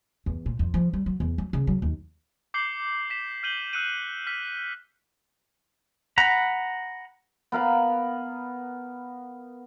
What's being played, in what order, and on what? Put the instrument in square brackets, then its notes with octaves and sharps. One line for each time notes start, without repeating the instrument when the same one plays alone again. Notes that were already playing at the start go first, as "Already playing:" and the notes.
[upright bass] E2
A#2
F2
F3
G3
F#3
E2
F#3
C#3
F#3
D#2
[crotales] D6 G6 C7 C#7 F#7 G7
D6 B6 E7
F6 G6 D#7 F#7 G7
E6 F#6 C#7 D#7
F6 B6
[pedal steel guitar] F#5 A#5 B5
[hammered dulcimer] B3 A#4 F5 B5